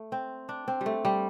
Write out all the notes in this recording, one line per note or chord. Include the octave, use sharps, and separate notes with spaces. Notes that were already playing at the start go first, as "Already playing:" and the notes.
Already playing: A3
C4
D4
C4
G3
A3
G3